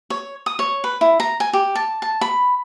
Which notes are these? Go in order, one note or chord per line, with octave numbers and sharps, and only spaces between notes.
C#5
D#6
C#5
B4
E4
A#5
G#5
G4
A5
A5
B5